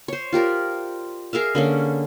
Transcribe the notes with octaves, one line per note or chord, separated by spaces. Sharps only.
C5 C#5
F4 G4 A#4 D5
G#4 A#4 E5 F5
D3 A#3 C#4